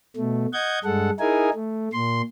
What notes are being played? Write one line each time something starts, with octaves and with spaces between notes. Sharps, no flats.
B2 A3
D#5 F#5 G6 G#6
G2 G#3 A4 F#5
D#4 E4 G#4 A#4 G#5
A3
A#2 C6